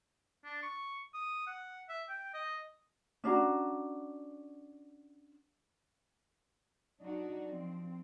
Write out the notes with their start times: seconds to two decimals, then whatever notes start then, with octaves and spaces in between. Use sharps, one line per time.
0.44 D4
0.63 C#6
1.14 D#6
1.47 F#5
1.89 E5
2.09 G5
2.34 D#5
3.24 C#4 D4 F#4 A#5
7.00 F#3 D4 D#4 F#4
7.47 F3 C4